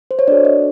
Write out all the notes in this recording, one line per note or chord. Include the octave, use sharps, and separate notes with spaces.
C5
C#5
D4 F#4 A4 D5
D#5